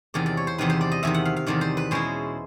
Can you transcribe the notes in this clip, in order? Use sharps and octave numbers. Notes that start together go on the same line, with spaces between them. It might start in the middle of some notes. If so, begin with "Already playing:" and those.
E2 C3 D#3 D5
D5
C#5
C5
E2 C3 D#3 B4
C5
D5
D#5
E2 C3 D#3 E5
F#5
F5
F5
E2 C3 D#3 D5
C5
B4
B2 G#3 C#4 E4 C5